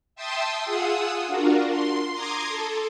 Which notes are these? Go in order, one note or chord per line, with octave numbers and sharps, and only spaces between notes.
E5 G5 A5 C6 D#6 E6
F4 G#4 F#5 D#6 E6
D4 F4 F#4 A#4
C6
A#5 C6 D6 D#6 G#6
A4